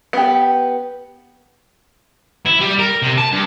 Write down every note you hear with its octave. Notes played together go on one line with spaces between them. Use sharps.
B3 G4
E4
G3
A#4
C3
A5
G2